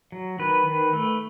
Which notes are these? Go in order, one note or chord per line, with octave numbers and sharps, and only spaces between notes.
F#3
D#3 B4
D#3
A3